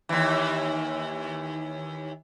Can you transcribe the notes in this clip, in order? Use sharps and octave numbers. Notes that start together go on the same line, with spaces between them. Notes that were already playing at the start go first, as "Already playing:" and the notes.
D#2 E3